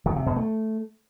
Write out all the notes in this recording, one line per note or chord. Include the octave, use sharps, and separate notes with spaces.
D#3
C3
B2
A3